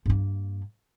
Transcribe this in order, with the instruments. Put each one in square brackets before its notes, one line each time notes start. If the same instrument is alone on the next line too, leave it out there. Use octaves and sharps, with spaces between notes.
[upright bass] G2 A#3